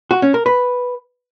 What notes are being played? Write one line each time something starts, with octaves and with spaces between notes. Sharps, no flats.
F#4
C#4
A#4
B4